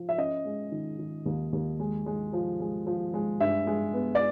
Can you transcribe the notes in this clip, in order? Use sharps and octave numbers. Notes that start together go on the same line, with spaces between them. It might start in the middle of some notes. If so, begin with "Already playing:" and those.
Already playing: F3
E5
C#4 D#5
G#3
D#3
D#3
D#2
D#2
G#3
G#3
F3
G#3
F3
G#3
G2 E5
G#3
B3
D5